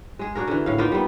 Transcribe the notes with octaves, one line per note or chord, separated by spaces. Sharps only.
G#3 G#4
D4 F#4 G#4 A#4
D3 E3
A2 F5
A#3 B3 D#4 F4
G3 B3